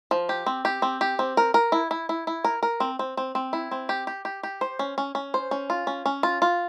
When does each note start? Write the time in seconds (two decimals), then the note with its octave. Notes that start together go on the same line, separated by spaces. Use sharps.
0.11 F3
0.29 G4
0.46 C4
0.65 G4
0.82 C4
1.01 G4
1.19 C4
1.37 A#4
1.54 A#4
1.72 E4
1.91 E4
2.09 E4
2.27 E4
2.44 A#4
2.63 A#4
2.80 C4
2.99 C4
3.17 C4
3.35 C4
3.53 E4
3.71 C4
3.89 G4
4.07 G4
4.25 G4
4.43 G4
4.61 C5
4.79 C#4
4.98 C#4
5.15 C#4
5.34 C5
5.51 C#4
5.70 F4
5.87 C#4
6.06 C#4
6.23 F4
6.42 F4